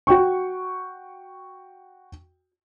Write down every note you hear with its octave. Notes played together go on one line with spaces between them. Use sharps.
F#4 G5 C#6